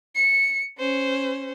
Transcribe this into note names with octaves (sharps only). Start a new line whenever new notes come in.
C#7
C#4 C5